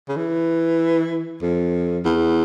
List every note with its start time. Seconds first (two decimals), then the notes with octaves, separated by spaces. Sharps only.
0.09 C#3
0.16 E3
1.42 F2
2.05 E2